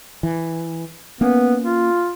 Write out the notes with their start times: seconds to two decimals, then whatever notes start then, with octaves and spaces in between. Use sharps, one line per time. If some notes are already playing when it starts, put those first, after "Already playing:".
0.23 E3
1.21 A#3 B3 C#4
1.63 F4